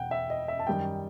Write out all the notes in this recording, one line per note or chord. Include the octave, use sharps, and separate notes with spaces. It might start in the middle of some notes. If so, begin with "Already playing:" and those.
Already playing: E1 F#5 G5
E5
D#5
E5
A5
F#2 D#3 G3 D#4 G5